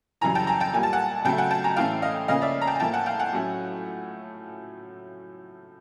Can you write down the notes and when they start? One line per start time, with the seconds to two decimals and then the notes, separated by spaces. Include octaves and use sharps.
0.21 F#2 C#3 E3 G3 G#5 A#5
0.35 G5 A5
0.47 G#5 A#5
0.60 G5 A5
0.73 A#2 G3 A#3 G#5
0.83 A5
0.93 F#5 G#5
1.25 C#3 F#3 A3 G5 A5
1.38 F#5 G#5
1.51 G5 A5
1.64 G#5 A#5
1.76 A2 E3 A3 C#4 F5 G5
2.02 D#5 F5
2.28 C#3 F3 A#3 C#4 D#5 F5
2.42 D5 E5
2.62 A#5
2.67 G5 A5
2.75 G#5
2.80 A2 F3 A#3 G5 A5
2.93 F#5 G#5
3.06 F5 G5
3.19 F#5 G#5
3.33 A2 F#3 A3 C#4